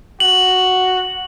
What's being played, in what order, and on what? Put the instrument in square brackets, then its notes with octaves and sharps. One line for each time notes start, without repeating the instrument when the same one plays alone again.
[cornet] F#4 [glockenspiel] F#7